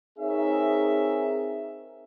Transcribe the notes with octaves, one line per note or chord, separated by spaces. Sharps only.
C4 D#4 G#4 A#4 C#5 E5